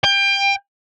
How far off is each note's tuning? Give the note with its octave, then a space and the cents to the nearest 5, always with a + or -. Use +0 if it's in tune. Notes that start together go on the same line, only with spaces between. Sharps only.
G5 +25